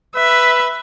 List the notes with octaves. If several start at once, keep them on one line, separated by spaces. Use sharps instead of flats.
B4 E5